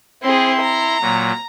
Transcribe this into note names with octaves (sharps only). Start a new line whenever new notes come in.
C4 E4 G#4 C6
A#5
A#2 F#3